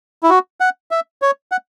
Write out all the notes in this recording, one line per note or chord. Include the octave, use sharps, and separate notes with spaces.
E4
F#4
F#5
E5
C#5
F#5